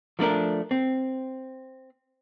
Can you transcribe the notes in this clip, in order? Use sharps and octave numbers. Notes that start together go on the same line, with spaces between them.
F3 A3 D4 A#4
C4